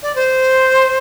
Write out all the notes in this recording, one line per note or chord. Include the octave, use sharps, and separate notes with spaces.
D5
C5